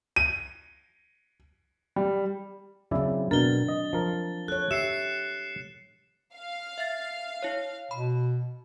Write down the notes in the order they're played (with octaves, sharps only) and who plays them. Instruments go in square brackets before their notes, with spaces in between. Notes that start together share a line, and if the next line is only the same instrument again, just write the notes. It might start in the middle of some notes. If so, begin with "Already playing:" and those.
[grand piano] D#7
G3
[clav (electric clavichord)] C#3 E4 D5 [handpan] F#3 C4
[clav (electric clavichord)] B2 A#4 [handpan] D4 [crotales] A6 G7
[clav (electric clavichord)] D#5
F3 A#4
[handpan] A4 C#5 [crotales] F#6
[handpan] G4 [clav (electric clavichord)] E5 [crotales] C7 C#7 E7
[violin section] F5
[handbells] E5 A6
E4 C#5
[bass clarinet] B2 [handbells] B5